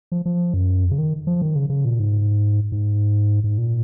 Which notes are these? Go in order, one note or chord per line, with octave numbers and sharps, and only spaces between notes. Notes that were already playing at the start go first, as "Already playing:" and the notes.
F3
F3
F#2
F2
C#3
D#3
F3
D#3
C#3
C#3
A#2
G#2
G#2
G#2
A#2